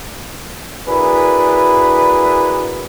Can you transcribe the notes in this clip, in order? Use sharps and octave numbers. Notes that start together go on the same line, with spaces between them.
D4 E4 F#4 G#4 A#4 B4